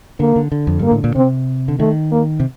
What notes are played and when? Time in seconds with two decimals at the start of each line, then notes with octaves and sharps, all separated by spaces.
0.20 D3 A#3
0.36 D3
0.52 D3
0.67 F2
0.79 G2 A#3
0.91 A2
1.04 A#2
1.15 C3 C4
1.68 D3
1.79 D#3 A3
2.11 A#3
2.40 C3